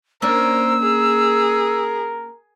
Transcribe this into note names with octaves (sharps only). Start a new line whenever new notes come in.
A#3 C#4 D4 A#4 C5 E6
G#4 A#4